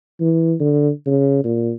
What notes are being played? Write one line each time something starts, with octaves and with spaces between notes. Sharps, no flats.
E3
D3
C#3
A#2